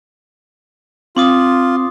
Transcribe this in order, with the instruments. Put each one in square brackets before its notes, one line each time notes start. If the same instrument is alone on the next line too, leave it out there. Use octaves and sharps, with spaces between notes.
[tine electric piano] C4 [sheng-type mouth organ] F4 [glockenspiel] C6 D6 D#6